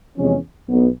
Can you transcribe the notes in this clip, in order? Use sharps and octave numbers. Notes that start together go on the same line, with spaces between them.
E2 C3 F3 G#3 C#4
B1 B2 F#3 B3